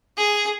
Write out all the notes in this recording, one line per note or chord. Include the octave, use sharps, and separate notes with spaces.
G#4